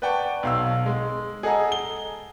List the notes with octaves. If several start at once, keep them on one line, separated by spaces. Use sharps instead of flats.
B4 D5 F#5 G5 A5 C#6
B1 F5 E6
G#3
G#4 A4 D#5 F#5 A#5
G7